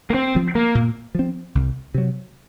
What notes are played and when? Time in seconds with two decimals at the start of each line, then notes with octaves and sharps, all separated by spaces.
0.10 A#3
0.14 C4
0.35 F3 C4
0.55 A#3
0.75 A#2
1.15 F3 C4
1.55 C2
1.94 C3 F#3